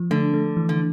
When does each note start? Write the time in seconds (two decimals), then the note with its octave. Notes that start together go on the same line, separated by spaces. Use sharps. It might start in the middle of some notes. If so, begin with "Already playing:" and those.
Already playing: F3
0.11 D3 A3
0.34 A3
0.57 E3
0.69 D3